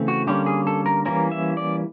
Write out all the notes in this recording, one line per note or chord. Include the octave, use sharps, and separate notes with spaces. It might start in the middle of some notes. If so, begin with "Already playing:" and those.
Already playing: C#3 E3 A3 C4
F#4
D3 G3 A#3 C#4 G4
G#4
A4
A#4
E3 G3 A#3 C#4 A#4
E5
D5